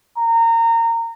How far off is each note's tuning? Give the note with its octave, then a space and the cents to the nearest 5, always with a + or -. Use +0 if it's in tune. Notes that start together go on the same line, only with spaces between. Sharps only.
A#5 -25